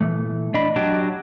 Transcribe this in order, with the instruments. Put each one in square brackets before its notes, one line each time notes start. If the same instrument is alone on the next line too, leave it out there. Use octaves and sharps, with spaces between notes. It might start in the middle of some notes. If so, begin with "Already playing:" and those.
[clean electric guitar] A#2 E3 A3
[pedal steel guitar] D4 B5 [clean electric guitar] D#5
[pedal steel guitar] F#3 D4 G4